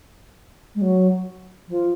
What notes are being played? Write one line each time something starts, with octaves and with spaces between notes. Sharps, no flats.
G#3
F#3
F3